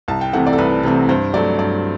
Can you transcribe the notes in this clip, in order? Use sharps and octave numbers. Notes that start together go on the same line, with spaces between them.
C2 A5
G5
C3 E3 A3 C4 F#5
D5
A4
C2 B4
C3 E3 A3 C4
G2 C5
F#3 A3 D5
G2 D5